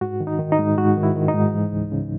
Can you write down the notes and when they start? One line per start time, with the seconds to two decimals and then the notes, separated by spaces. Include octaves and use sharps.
0.01 G#2 F#4
0.20 D#3
0.27 D#4
0.39 D#3
0.52 D#4
0.59 G#2
0.78 G#2 F#4
0.97 D#3
1.03 E4
1.16 D#3
1.28 D#4
1.34 G#2
1.54 E3
1.73 C#2
1.92 C#3